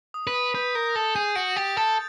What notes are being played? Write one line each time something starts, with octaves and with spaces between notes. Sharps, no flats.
D#6
B4
D#6
B4 G6
A#4 G6
A4 D#6
G#4 G6
F#4 D7
G4 A6
A4 A6